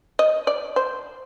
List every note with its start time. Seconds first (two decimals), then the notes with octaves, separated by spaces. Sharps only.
0.19 D#5
0.47 D5
0.76 C5